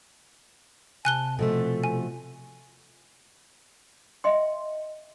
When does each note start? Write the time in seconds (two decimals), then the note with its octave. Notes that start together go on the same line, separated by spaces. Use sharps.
1.05 C3 G#5 A5 F#6 G7
1.39 B2 F3 A3 A4
1.84 G#5
4.24 D#5 E5 G5 C6